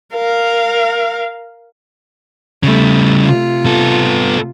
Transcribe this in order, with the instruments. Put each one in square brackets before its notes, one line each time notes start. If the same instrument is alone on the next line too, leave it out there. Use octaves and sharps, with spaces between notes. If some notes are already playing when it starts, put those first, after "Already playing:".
[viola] A#4 F5
[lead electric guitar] C#3 G3 [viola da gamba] A3
[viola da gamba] C3 F4
[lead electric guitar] B3 A4